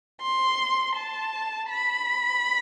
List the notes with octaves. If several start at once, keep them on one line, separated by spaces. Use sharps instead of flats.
C6
A5
B5